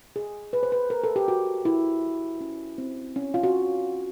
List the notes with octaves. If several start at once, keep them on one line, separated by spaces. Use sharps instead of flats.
G#4
B4
C5
B4
A#4
A4
G4
F#4
E4
C#4
C4
C#4
F4
F#4